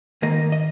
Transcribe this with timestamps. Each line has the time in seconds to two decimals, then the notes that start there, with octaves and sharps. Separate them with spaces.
0.22 G#2 D#3 A#3 D#5
0.52 D#5